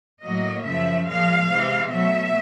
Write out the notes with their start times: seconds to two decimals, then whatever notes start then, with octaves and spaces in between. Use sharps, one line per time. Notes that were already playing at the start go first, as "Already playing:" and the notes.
0.24 A2 F#3 A#3 D#5
0.65 F#2 C#3 F3 E5
1.08 A#2 F3 G#3 F5
1.49 C3 E3 G#3 C4
1.91 B2 F#3 A3 E5